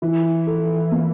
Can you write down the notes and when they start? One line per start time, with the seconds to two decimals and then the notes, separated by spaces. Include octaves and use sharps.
0.02 E3 E4
0.47 A4
0.92 A#3